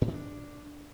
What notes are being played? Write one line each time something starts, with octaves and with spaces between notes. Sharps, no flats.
A2
D#3
D4